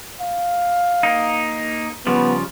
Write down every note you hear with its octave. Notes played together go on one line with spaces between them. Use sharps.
F5
A#3 D#4
C#3 F3 G3 B3